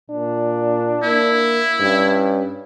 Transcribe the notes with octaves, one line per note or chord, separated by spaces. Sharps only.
A#2 D4
A#3 E4
G2 C#4